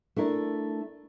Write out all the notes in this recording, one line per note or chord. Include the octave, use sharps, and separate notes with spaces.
A3 D4 E4 A#4